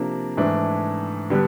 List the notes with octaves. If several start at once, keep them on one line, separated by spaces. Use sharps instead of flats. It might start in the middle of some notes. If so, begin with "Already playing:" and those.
Already playing: C3 F3 A#3 D4
G#2 E3 A3 D4
D3 G3 B3